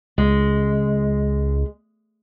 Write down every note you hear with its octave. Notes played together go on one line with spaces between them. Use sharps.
C#2 G#3